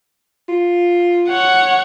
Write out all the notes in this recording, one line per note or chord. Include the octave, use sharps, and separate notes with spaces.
F4
C#5 F#5